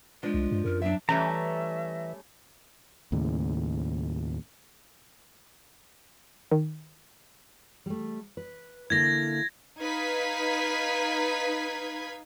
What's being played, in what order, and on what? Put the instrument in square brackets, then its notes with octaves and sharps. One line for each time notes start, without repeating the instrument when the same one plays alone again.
[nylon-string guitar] F3 D4 [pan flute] G#3
[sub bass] C2
G2
[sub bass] F#2 [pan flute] A#4
[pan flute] F#3 [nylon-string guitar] D4 E5
[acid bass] E3 [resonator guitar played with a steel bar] G3 A3 C#4 [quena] E5 [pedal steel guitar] A#5
[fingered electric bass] D#2 A2 C#3
[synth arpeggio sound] D#3
[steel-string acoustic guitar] G3 A3
B4
[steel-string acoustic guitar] D3 A#3 E4 [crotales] G#6 A#6
[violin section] D#4 B4 F5 G#6 B6